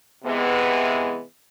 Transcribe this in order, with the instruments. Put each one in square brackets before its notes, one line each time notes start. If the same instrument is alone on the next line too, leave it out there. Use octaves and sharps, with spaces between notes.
[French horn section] C3 E3 G#3 B3